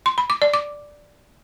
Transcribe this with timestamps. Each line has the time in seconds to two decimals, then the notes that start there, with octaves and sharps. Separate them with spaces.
0.06 C6
0.18 B5
0.30 D6
0.42 D5
0.54 D6